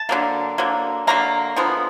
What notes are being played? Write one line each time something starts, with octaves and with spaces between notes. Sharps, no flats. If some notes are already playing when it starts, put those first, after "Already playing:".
Already playing: A5
D3 F#3 A#3
D3 F#3 A#3
D3 F#3 A#3 A#5
D3 F3 G#3 B3